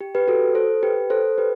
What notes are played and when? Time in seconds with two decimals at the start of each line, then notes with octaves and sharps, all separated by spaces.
0.01 G4
0.15 G4 B4
0.28 F#4 A4
0.55 A4 C5
0.83 G4 B4
1.10 A4 C5
1.38 G4 B4